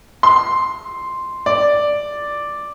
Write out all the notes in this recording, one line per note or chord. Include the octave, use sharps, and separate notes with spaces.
C6
D5